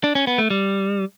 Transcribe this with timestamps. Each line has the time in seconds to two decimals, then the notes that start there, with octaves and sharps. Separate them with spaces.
0.04 D4
0.15 C#4
0.27 B3
0.38 A3
0.50 G3